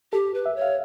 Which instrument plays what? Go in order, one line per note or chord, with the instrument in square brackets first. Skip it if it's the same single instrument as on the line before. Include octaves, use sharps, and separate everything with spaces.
[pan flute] G4 [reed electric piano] A4
[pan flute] B4
[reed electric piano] E5
[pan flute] C#5
[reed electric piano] F5